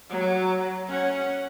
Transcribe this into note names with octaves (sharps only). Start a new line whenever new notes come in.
F#3
C#4 F#5